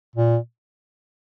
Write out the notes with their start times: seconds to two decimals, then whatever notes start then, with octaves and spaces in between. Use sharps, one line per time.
0.16 A#2